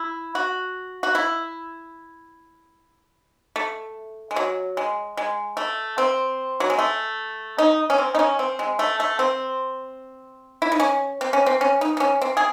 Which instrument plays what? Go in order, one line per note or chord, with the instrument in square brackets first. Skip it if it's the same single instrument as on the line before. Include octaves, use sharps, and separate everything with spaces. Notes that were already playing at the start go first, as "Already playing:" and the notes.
Already playing: [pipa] E4
F#4
F#4
E4
A3
G#3
F#3
G#3
G#3
A3
C4
F#3
G#3
A3
D#4
C#4
C4
D#4
C#4
C4
G#3
A3
A3
C4
E4
D#4
C#4
C4
C#4
C4
C#4
D#4
D#4
C#4
C4
G#4